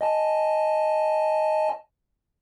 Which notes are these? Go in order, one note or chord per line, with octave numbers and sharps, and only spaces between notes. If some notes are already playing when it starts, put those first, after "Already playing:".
D#5 G#5 A5